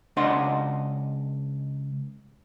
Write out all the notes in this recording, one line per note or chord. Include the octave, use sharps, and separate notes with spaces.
C#2 D4 D5 D#5 F#5 C6